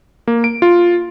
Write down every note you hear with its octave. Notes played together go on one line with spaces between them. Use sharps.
A#3
D7
F4